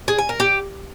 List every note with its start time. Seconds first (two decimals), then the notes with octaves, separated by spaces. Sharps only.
0.08 G#4
0.19 G#5
0.29 A#4
0.40 G4